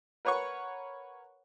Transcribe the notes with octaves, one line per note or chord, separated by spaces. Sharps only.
A#4 B4 C#5 F#5 C#6